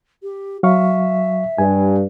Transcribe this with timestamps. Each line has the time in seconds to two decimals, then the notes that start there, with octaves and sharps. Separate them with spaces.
0.23 G4
0.63 F#3 E5 F5 C#6
1.58 G2 G#5